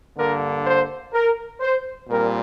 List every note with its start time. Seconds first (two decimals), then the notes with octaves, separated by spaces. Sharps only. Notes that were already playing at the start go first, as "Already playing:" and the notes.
0.15 G2 D3 A#3 A#4
0.63 C5
1.12 A#4
1.60 C5
2.09 A#2 G3 C4 A#4